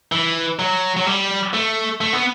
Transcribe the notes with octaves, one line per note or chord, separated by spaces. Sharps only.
E3
F#3
F#3
G3
A3
A3
B3